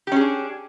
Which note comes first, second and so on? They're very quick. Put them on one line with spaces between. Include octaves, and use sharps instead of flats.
G4 C#4 G#4 D4